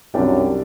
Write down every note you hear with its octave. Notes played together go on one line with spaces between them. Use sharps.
C2 F#2 C3 G3 D4 G4